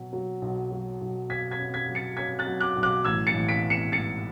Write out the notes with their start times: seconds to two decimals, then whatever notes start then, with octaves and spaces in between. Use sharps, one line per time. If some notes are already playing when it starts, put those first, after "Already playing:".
Already playing: B2 F#3
0.13 F#3
0.42 B1
0.71 F#3
1.01 B1
1.29 B2 G#6 B6
1.51 G#6 B6
1.59 C#4
1.74 G#6 B6
1.88 F#3
1.95 A6 C#7
2.17 C#4 G#6 B6
2.39 F#6 A6
2.47 F#3
2.60 D6 F#6
2.76 B1
2.83 D6 F#6
3.05 A1 E6 G#6
3.27 A6 C#7
3.34 A1
3.48 B6 D7
3.63 B3
3.70 C#7 E7
3.92 G#2 A6 C#7